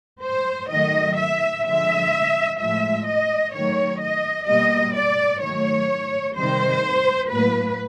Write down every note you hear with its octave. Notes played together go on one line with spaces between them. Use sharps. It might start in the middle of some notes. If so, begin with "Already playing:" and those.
C5
D#3 F#3 A3 D#5
E5
D3 F3 G#3 E5
A2 F3 G#3 E5
D#5
D#3 F#3 A3 C#5
D#5
B2 G3 A#3 D#5
D5
D#3 F#3 A3 C#5
C3 D#3 G3 C5
A2 F#3 A#3 B4